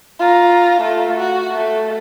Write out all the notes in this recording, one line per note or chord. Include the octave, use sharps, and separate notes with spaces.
F4 A#5
A3 F4
F#4
A3